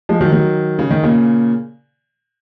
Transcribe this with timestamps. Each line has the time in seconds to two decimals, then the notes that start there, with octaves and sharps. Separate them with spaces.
0.09 F3 G#3
0.21 D#3 F#3
0.32 D#3 F#3
0.79 C#3
0.91 D#3
1.03 A#2 C#3